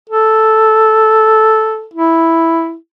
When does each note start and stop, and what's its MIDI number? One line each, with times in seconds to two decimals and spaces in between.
0.10 1.86 69
1.94 2.76 64